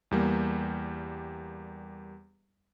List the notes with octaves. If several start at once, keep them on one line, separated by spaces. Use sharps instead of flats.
E2 G3 A#3